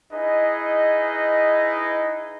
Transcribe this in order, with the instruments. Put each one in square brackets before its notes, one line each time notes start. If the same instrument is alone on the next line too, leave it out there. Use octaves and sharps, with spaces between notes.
[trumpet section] D#4 E4 G#4 B4 D#5